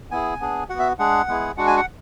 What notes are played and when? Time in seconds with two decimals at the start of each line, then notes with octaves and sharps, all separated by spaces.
0.11 B3 E4 G#4 G#5
0.40 B3 D4 G#4
0.69 F#4 F#5
0.74 B3
0.79 E5
0.99 G#3 D4 G#4 F#5
1.28 G#3 B3 E4 G#4
1.57 G#3 D4 F#4 F#5
1.67 G#5
1.77 F#5